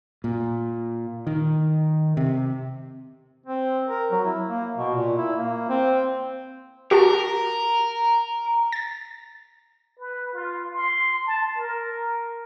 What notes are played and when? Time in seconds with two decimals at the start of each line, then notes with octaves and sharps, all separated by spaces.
0.24 A#2
1.27 D#3
2.17 C3
3.46 C4
3.88 A#4
4.11 F#3
4.25 E4
4.47 A#3
4.76 B2
4.94 A#2
5.18 E4
5.36 A#3
5.69 C4
6.91 F#4 G4 A#4 A5
8.72 A6
9.99 B4
10.33 F4
10.73 C6
11.26 A5
11.58 A#4